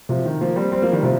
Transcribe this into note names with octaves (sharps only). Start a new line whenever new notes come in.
C3 F3
D#3
F3 A#3
G3 C4
G3 C4
F3 A#3
D#3 G3
C3 F3